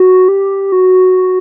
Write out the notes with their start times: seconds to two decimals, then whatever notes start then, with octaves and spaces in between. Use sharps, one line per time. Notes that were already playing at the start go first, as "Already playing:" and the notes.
Already playing: F#4
0.28 G4
0.72 F#4